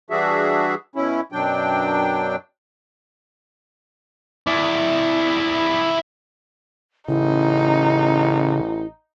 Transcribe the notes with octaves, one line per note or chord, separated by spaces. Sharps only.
E3 G3 D4 F#4 G#4 E5
B2 C#4 E4
F#2 B2 F#3 D4 G5
E4 D5
A1 C#3 D#4 E4